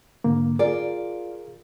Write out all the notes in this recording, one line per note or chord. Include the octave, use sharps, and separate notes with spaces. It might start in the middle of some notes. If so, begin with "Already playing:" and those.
G#2 D3 A#3
F4 G#4 A#4 D5